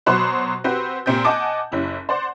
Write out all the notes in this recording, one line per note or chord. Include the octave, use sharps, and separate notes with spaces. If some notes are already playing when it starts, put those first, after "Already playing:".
B2 F#3 F#4 C5 B5 F#6
C4 F#4 G4 B4
A#2 C4 G4 G6
D#5 F#5 G#5 A5 D6
F#1 C#4 E4 G4
C5 D5 F#5